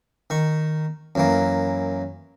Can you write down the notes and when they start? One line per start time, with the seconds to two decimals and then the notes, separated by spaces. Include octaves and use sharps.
0.30 D#3 C#6
1.15 F#2 E3 A#3